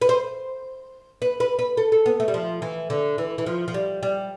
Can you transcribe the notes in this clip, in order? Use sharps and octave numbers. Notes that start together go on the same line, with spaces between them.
B4
C5
B4
B4
B4
A4
A4
B3
A3
G3
F3
E3
D3
E3
E3
F3
F3
G3
G3